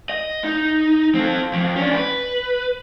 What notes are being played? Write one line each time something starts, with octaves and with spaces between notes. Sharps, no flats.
D#5
D#4
C4 A4
F2
C#4 D4
B4